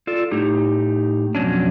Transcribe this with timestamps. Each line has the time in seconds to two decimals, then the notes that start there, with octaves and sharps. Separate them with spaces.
0.07 F4 A4 D5
0.31 A2 D#4 G4
1.35 F2 B2 F#3 C#4 D4